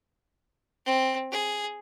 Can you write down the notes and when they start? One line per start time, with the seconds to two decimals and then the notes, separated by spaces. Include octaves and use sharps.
0.86 C4
1.32 G#4